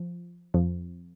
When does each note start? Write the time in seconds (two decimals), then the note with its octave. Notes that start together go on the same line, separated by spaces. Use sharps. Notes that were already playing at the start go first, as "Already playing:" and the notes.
Already playing: F3
0.54 F2 F3